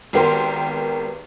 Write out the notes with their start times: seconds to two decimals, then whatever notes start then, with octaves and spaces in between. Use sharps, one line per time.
0.13 G#1 B3 G4 A#4 C6